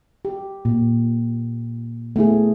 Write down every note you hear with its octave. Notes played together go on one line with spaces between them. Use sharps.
G4
A#2
A3 B3 E4 G#4